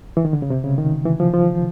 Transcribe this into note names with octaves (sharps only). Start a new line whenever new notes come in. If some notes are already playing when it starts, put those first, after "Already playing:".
E3
D#3
D3
C#3
C3
C#3
D#3
E3
F3
F3